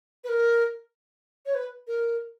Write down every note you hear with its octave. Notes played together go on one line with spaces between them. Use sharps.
B4
A#4
C#5
B4
A#4